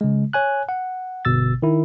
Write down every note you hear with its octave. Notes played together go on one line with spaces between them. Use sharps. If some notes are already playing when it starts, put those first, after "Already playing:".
C#3 G#3
C#5 G#5 F#6
F#5
G1 B2 E6 A6
D#3 E4